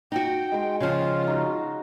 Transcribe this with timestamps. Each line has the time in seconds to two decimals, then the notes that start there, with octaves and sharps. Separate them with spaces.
0.12 D#4 F#4 G5
0.52 G#3 C6
0.80 C#3 F3 F4
1.27 D#4 F#4